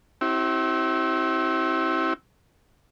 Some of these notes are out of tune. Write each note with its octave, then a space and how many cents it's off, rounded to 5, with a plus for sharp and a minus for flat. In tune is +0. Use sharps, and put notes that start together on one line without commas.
C4 +30 E4 -20 G4 -45